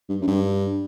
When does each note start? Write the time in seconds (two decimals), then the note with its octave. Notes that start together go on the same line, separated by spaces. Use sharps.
0.09 G2
0.21 F#2
0.27 G2